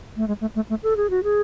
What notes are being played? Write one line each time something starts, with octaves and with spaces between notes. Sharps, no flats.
A3
G#3
A3
A3
A3
A4
G#4
F#4
G#4